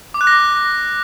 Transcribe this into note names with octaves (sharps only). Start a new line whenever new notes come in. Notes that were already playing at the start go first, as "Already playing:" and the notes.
D6
F#6
A#6